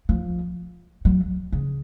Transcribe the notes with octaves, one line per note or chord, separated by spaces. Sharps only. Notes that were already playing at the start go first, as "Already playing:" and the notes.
F3
F#3
C#3